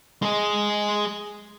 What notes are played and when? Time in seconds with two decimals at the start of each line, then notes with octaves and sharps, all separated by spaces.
0.22 G#3 G#4